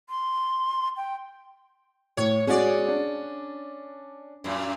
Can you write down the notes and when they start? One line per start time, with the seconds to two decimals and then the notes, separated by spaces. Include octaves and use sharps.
0.09 C6
0.97 G5
2.17 A2 C#5
2.47 G#3 C#4 F#4 G#4 D5
2.88 D4
4.44 F#2 A#2